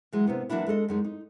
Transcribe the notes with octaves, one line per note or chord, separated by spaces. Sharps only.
E3 F#3 G#3
C3 A#3 B3 D4
E3 F#3 A#3 D4 E4
G#3 D4 A4 D#5
F#2 G#3 D#4
D#4